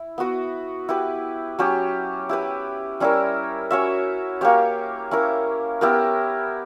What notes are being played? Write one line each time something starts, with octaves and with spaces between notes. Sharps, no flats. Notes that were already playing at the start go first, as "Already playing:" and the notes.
Already playing: E4
B3 F#4 B4
E4 G4 B4
F#3 C#4 G4
E4 G4 B4
G3 C#4 E4 A#4
C#4 F#4 C#5 E5
A#3 C#4 G4 C#5
C#4 E4 A#4
B3 E4 G4 A#4